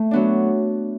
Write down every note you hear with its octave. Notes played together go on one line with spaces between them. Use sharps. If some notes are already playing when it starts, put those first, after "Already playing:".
Already playing: A3
F#3 B3 D4